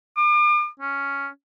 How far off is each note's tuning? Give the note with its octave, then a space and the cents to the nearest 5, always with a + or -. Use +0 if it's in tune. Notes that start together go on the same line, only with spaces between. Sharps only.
D6 +40
C#4 +5